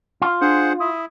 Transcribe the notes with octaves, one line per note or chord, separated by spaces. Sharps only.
F4
D4 G#4 C5 F#5
E4 D#6